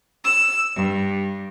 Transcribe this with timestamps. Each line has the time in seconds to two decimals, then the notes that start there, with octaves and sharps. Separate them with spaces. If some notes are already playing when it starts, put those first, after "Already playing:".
0.24 E6
0.75 G2